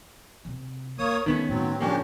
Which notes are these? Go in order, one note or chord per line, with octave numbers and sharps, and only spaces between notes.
C3
C#2 A#3 C#5 D#6
D#3 G#3 A3 B3 C#4
A2 F#3 C4
C#3 F3 A#3 C#4 D4 G4